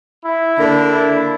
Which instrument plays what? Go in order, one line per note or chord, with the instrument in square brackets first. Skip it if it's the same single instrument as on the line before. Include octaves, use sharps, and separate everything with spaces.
[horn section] E4
D3 A#3 D4
E4